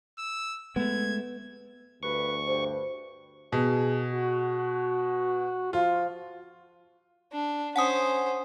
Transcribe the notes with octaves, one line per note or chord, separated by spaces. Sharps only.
E6
G#3 A3 B3 G#6
D2 G2 B4 C#6
G2 C5
B2 G#4
F#4
F3 F4
D4
C#4 C5 F#5 G#5 D#6